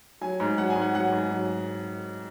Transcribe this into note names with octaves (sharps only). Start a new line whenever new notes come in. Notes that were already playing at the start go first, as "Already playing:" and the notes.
F#3 G#5
G#2
F#3 F#5
G#5
G#2
F#5
F#3 F#5
G#2
F#3